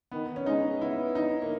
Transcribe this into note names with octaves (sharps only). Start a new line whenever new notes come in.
D#3 B3
C#4
G#3 D#4
B3 E4
D#4
A#3